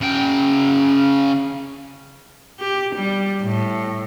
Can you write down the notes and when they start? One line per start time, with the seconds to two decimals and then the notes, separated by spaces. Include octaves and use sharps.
0.01 C#3 G5
2.60 G4
2.96 G3
3.43 A2